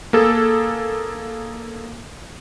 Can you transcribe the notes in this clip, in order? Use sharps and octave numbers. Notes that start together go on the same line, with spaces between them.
A#3 G#4 A4